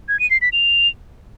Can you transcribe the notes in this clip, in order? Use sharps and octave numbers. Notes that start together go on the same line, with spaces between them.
G#6
D#7
C7
B6
F7